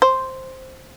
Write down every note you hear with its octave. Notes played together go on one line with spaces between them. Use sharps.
C5